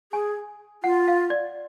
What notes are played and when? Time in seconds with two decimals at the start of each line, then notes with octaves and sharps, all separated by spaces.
0.12 G#4 G#5
0.83 F4 F#5
1.08 F5
1.30 D5